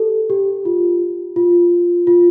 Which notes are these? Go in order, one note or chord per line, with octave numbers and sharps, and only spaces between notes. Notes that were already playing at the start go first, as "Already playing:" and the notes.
Already playing: G4 A4
G4
F4
F4
F4